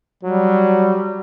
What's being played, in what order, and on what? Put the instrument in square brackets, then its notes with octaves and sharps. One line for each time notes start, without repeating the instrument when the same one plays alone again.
[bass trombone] F#3 [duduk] G3